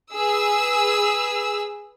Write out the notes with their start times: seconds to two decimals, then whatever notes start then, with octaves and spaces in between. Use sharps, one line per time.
0.15 G#4 B4 E6